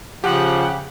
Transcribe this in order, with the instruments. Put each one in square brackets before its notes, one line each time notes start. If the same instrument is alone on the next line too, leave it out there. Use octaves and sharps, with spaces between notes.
[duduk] C#3 [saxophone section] F3 [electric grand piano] G4 [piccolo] F#5